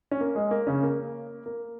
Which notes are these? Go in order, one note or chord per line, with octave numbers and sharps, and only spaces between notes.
C#4
A#3
G#3
A#3
C#3 C#4
A#3
A#3